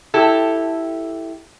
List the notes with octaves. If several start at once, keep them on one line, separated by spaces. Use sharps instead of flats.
E4 G4 A4